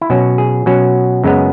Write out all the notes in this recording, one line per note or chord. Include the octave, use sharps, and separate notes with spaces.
E4
B2 F#3 C#4 F#4
G#4
B2 F#3 C#4 F#4
F#2 C#3 G#3 B3